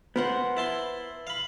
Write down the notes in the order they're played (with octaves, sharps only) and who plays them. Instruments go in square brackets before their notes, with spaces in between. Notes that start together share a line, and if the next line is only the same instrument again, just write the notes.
[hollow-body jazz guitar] B3 [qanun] A#4 C5 F#5
[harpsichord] E4 A5 C6
F5 B5